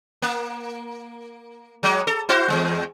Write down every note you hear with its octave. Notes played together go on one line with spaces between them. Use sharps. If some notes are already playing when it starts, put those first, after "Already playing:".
A#3
F#3 G#3
A4
E4 F#4 C5
E2 F#3 G#3